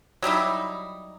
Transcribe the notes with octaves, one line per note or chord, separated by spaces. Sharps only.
F#3 G3 D#4 E4